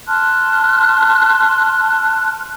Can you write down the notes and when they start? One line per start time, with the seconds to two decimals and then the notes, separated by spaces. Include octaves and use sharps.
0.08 A5 C6 F6 F#6